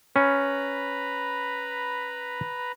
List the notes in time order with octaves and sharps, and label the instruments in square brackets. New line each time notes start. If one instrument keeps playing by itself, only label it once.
[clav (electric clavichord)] C#4 [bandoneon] B4 A#5 B5